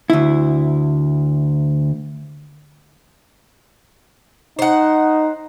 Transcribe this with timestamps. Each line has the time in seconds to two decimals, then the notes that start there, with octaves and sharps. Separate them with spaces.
0.10 D2 E4
4.59 D#4 C5 F#5